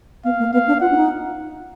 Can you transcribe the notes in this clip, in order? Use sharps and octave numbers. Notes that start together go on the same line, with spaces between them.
B3 F5
A#3
B3 F5
D4
F4 F#5
D4
D#4